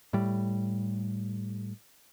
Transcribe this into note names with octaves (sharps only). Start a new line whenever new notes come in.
A2 G3